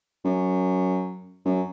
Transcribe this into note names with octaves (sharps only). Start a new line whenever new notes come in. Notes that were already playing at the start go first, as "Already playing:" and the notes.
F#2
F#2